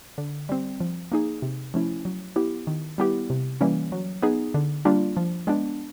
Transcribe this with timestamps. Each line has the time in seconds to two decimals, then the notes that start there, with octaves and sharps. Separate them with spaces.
0.18 D3
0.49 G3 C4
0.80 F3
1.12 A#3 D#4 G#4
1.42 C3
1.74 F3 A3 C#4 E4
2.05 F#3
2.36 B3 E4 G4
2.67 D#3
2.98 G3 B3 E4 G4
3.30 C3
3.61 E3 G3 A#3 C#4
3.92 F#3
4.22 B3 D#4 G#4
4.54 D3
4.85 G3 A#3 D4 F4
5.17 F3
5.47 G#3 B3 D4